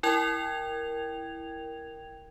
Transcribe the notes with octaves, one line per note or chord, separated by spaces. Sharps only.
E4 A#4 G5 G#6 F7